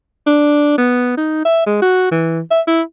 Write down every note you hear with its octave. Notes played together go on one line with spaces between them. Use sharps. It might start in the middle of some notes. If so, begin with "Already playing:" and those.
D4
B3
D#4
E5
G#3
F#4
E3
E5
E4